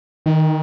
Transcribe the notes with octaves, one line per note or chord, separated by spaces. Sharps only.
D#3